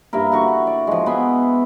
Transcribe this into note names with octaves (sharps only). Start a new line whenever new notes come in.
G2 A#3 E4 A#4
D3 F#4 B5 C#6
D5
F3 G#3
B3 G#4 E5